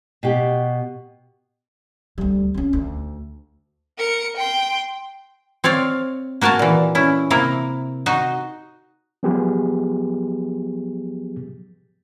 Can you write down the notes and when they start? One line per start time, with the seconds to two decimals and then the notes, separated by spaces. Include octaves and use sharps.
0.23 B2 G4
2.18 D2 G3
2.54 C4 C#4
2.73 D2
3.98 A#4 C#7
4.37 G5 C6
5.64 C4 C#5 D5 F5
6.41 A#3 F#4 A#4 G#5 A5
6.59 A#2 E3
6.95 C#4 E4
7.30 C3 A#3 E4 A#4
8.06 D#4 F#4 D#5
9.23 F3 F#3 B3 G4 G#4